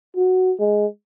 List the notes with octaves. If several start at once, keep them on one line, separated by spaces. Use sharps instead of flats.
F#4
G#3